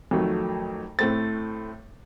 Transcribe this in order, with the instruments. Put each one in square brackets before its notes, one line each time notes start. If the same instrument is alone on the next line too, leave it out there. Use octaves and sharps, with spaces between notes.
[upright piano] F2 D#3 F#3 A3
A2 A3 C4 A6